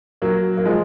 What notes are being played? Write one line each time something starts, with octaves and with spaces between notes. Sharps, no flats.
F#3 A#3
A#3
F3 G#3